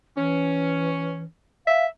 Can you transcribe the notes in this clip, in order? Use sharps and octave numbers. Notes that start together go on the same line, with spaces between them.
E3 C#4
E5 F5